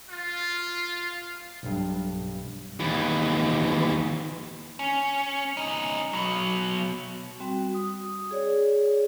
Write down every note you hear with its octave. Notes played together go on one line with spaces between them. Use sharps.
F4
B1 G2
D#2 E3
C#4
C#4 D#4
B2 F#3
G3 C4 F#4
D#6
G#4 C#5 D5